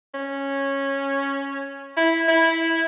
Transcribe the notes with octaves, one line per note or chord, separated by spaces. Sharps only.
C#4
E4
E4